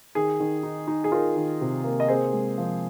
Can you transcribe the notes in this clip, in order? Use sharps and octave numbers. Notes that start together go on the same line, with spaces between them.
D#3 G#4
D#3
D#4
D#4
G#4
D#4 F4 A#4
D#3
C3
A#3
D#5
C4 G#4 C5
G#3
F3